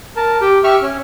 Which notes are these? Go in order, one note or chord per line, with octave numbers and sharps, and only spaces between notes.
A#4 A5
G4 G5
G4 E5 C#6 E6 F6
C#4